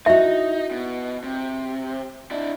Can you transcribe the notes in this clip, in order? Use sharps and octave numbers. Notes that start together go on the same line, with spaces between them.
D#4 E4 F#4 E5
B2
C3
D4 E4